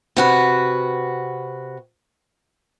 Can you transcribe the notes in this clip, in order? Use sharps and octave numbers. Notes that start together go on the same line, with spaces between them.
C3 F#4 B4